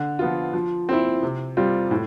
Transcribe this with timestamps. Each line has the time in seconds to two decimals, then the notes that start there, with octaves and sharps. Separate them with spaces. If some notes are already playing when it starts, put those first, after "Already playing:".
Already playing: D3
0.19 F3 B3 F4
0.53 F3
0.89 C4 E4
1.23 C3
1.57 G3 C4 F4
1.91 A2